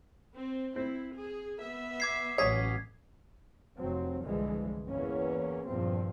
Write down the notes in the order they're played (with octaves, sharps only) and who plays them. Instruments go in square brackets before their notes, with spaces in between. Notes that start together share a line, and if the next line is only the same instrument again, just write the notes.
[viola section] C4
[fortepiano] C4 [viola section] E4
[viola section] G#4
B3 E5
[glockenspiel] D6 G#6 C7
[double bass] A1 F#3 [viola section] C#4 [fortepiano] C#5 D#6 [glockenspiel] G#6 B6
[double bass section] F1 F#3 C4
C2 G2 D3 E3 F3 G#3
E2 E3 A#3 C#4
E2 G2 A#2 F3 C4